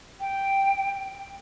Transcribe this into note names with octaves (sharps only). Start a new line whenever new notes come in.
G5